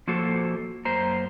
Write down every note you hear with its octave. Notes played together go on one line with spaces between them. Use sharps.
F3 A#3 F#4 A4 C5
F#2 A#3 C5 A#5